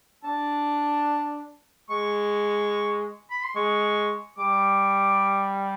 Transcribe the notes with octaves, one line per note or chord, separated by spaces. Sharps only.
D4 A5
G#3 C#6
B5
C6
G#3 C#6
G3 D6